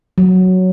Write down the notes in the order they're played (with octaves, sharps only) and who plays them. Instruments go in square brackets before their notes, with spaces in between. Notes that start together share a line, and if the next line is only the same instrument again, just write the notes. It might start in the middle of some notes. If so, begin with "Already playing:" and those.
[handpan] F#3